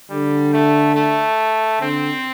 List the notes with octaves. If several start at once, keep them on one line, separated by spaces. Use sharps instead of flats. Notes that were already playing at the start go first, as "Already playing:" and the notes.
D3 G3
A3
A3
D3 C4